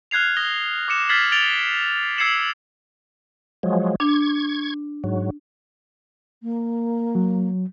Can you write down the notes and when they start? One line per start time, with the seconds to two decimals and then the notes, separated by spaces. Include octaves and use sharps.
0.11 F6 F#6 G#6 C7 F7
0.37 D#6 A#6 G7
0.88 D6 F#6 C#7 E7
1.09 F6 G#6 A6 B6 C7 F#7
1.32 A6 D7 F7 G7
2.18 E6 G#6 C7 C#7 E7 F#7
3.63 F3 F#3 G#3
4.00 D4 C#6 G#6
5.04 G#2 F#3
6.42 A#3
7.15 F#3